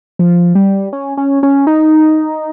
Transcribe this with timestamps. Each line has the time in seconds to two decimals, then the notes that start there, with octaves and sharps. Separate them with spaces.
0.19 F3
0.55 G3
0.93 C#4
1.17 C#4
1.43 C#4
1.67 D#4